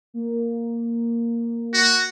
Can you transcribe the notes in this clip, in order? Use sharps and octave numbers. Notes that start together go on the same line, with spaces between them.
A#3
F#4